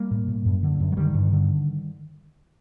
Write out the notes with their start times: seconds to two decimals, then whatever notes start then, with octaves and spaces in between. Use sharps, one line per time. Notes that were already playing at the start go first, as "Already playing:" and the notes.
Already playing: G3 A#3
0.11 A2
0.28 A2
0.46 F#2
0.63 D3
0.80 F#2
0.92 F#3
0.97 D3 D#3 G3
1.15 G2
1.32 D3